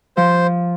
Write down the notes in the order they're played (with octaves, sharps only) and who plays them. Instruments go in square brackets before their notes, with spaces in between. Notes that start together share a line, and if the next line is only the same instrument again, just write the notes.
[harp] F3 [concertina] C5